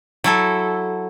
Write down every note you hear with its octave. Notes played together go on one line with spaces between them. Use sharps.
F#3 E4 A4